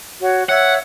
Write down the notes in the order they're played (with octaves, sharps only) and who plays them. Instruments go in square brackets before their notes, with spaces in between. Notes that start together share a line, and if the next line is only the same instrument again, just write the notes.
[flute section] F#4 C#5 F#5
[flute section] C#5 E5 E6 [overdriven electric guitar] F#5